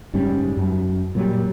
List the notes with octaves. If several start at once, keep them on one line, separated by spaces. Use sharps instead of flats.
F#1 G#2 G3 C#4
F#2
A#2 F#3 G3